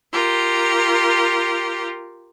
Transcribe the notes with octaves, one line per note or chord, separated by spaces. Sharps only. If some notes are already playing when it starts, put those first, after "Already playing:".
F4 G4 A#4